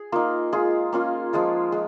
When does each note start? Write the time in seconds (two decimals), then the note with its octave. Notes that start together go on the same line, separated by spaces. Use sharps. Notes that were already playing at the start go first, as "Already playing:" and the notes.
Already playing: G#4
0.12 A#3 D#4 F4
0.53 G#3 F4 G#4
0.93 A#3 C#4 F4
1.33 F3 G#3 F4
1.72 G#3